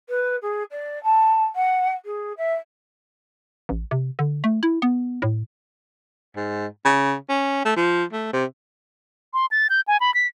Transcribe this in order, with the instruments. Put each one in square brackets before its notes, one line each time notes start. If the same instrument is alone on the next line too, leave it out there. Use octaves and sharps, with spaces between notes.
[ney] B4
G#4
D5
A5
F#5
G#4
E5
[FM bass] A1
C3
D3
A3
E4
B3
A2
[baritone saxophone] G#2
C#3
C#4
A3
F3
A3
C3
[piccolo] C6
A6
G6
G#5
B5
B6